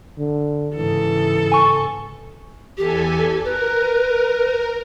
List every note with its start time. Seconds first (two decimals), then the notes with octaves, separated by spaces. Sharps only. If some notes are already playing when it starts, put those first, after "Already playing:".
0.18 D3
0.76 G#2 C#3 E3 A4
1.52 G#5 C#6
2.78 E2 G4 A4 G#5
3.44 A#4 B4